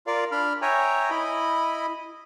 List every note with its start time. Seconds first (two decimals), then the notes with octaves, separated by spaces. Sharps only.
0.07 F4 A#4 D5 F5
0.32 D4 B5 F6
0.62 C#5 E5 G5 G#5 A#5
1.10 E4 D#5 B5